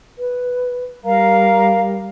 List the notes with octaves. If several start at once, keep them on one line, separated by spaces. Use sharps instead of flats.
B4
G3 A#4 F5 A#5